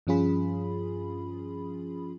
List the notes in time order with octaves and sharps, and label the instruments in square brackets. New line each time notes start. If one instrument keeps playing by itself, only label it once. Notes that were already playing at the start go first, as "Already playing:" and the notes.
[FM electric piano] G2 F3 C#4 F4 G#4 B5